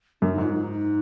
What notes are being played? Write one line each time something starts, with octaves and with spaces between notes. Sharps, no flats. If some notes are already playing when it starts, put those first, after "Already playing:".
F#2 D4
D#4
G#2 F4
D#4